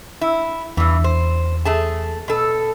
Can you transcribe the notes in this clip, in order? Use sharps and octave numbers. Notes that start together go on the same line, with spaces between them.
E4
E2 G2 E3
C5
A3 G#4 A5
B2 A4